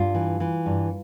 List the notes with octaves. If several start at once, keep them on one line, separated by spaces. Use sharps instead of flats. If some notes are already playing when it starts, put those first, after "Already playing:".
Already playing: G2 F4
E3
E3
G2